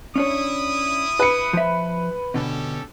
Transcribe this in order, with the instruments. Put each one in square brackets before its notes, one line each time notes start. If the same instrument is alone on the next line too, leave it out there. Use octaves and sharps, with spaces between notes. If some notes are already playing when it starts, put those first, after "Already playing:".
[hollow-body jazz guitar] C#4 D4 C#5 [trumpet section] E4 D#6
[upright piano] B4 C#7
[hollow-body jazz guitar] F3 E5
[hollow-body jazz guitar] B2 D3 [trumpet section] C#4 G4 A4